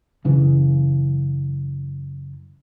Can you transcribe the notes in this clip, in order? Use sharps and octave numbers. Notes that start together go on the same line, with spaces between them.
F#2 C#3 E3